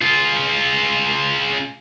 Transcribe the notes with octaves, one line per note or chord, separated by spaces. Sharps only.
C#3 F4